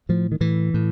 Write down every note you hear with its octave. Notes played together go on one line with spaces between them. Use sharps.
A2 F3
D#3
A2 E3
A2